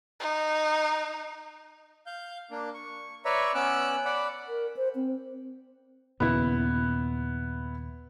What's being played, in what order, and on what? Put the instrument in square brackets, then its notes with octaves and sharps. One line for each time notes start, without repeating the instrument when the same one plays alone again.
[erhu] D#4
[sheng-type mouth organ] F5 G6
A#3 D4
C#6
B4 C#5 D5 E5 A#5 C#6
B3 C#4 D6 E6 F#6
D5 F#5 B5
[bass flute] A#4
C5
C4
[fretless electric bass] D#2 A#2 C#3 [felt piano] B3 E4